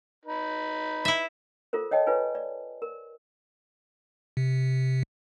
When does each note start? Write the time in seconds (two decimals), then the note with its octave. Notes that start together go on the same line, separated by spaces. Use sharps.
0.25 D#4 B4
1.05 E4 E5
1.73 F4 A4 A#4 C5
1.91 C#5 D#5 G5 A5
2.07 F4 B4 C#5 G#5
2.35 D5
2.82 A#4
4.37 C3